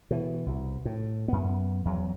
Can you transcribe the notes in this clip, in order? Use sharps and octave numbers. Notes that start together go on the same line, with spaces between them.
B2 E3
C2
A2
F#2 B3
E2 F#3